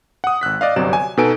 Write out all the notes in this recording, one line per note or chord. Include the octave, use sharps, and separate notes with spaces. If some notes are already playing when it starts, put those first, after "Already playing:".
F#5 D#6
G#1 E6 F#6 B6
D5 D#5 F5
G1 C3 F#3 D5 E7
G#5
B2 D#4 A4 B4 G#5 D7